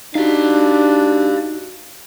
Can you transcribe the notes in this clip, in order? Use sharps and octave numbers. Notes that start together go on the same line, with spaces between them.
D4 D#4 F#4 G4 F5